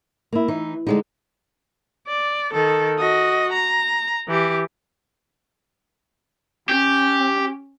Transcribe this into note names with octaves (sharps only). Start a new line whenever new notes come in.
A#3 E4
E3 D#4
D3 G3 G#3 D#4
D5
D#3 A4
F#4 D#5
A#5
E3 G4
C#4 G4